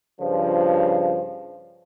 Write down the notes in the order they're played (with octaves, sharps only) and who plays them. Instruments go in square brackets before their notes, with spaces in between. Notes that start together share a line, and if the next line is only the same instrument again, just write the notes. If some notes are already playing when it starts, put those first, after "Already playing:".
[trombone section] G2 C#3 F3